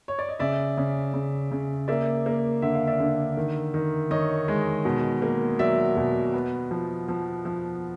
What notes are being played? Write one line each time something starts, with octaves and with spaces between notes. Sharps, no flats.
C#5
D5
D#5
C#3 D5 E5
C#3
C#3
C#3
A#3 D5 E5
A#3
D3 E5
F5
D5 E5
D3
D#3
D#3
D#3 C#5 D#5
G#3
B2
A#3
F#3 D5 E5
B2
B3
F3
F3
F3